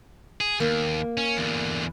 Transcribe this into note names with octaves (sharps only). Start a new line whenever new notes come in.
G#4
D#2 A#3
C#4
E2 D3